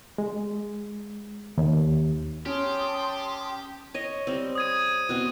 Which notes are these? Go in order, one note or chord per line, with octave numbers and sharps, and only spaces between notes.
G#3
D#2
C#4 G4 A5 C6 D#6
C#5 D#5
G3 C4
D#6 G#6 D#7
B2 C4